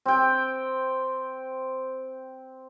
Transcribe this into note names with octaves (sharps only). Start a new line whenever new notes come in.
C4 G5